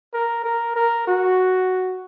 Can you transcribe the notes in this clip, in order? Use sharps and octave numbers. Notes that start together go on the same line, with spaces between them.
A#4
A#4
A#4
F#4